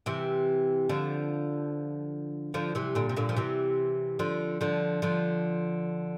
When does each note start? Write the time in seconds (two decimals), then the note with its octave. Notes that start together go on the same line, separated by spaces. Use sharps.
0.06 C3 E3
0.89 D3 F3
2.54 D3 F3
2.75 C3 E3
2.95 A#2 D3
3.09 C3
3.16 A#2 D3
3.29 F3
3.37 C3 E3
4.19 D3 F3
4.61 D3 F3
5.02 D3 F3